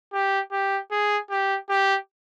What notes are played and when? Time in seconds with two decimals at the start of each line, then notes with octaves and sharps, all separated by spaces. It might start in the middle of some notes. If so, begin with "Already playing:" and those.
0.13 G4
0.52 G4
0.91 G#4
1.30 G4
1.69 G4